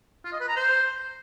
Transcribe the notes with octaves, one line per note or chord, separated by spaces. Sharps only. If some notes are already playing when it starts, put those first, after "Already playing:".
F4
D#5
B4
A#5
C5